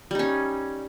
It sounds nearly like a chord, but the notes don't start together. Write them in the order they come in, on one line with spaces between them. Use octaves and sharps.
G3 D#4 C#4